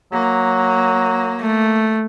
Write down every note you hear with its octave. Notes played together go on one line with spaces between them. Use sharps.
F#3 A#3
A3